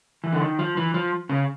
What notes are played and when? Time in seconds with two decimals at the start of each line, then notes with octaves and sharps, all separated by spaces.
0.24 E3
0.33 D3
0.42 D#3
0.59 F3
0.77 E3
0.94 F3
1.29 C#3